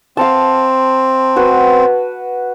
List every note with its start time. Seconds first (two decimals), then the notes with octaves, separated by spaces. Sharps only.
0.17 C4 F5 A5
1.36 F#4 B4